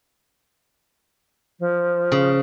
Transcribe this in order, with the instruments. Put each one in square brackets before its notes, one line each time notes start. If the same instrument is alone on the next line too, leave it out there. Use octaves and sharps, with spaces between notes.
[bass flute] F3
[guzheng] C#3